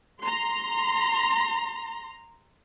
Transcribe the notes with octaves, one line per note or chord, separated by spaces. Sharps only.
A#5 C6